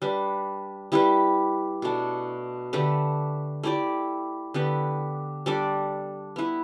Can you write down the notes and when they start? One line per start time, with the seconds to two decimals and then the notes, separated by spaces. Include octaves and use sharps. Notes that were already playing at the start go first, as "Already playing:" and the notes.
0.02 G3 D4 B4
0.92 G3 E4 G4 B4
1.82 B2 A3 D4
2.73 D3 A3 G4 B4
3.63 A3 E4 G4 D5
4.54 D3 B3 G4 B4
5.46 G3 D4 A4 D5
6.36 B3 E4 B4